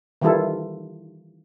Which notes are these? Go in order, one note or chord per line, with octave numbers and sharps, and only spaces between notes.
D#3 E3 G3 E4 F4 A4